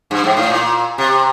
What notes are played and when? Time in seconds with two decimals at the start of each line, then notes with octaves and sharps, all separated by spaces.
0.11 G2
0.24 G#2
0.37 A2
0.50 A#2
0.98 C3